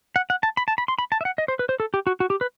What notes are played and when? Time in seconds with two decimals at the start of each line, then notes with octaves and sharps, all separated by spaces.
0.16 F#5
0.30 F#5
0.43 A5
0.57 B5
0.68 A5
0.78 B5
0.88 C6
0.99 B5
1.12 A5
1.21 E5
1.25 F#5
1.38 D#5
1.48 C5
1.59 B4
1.69 C5
1.80 A4
1.94 G4
2.07 F#4
2.20 F#4
2.30 G4
2.41 B4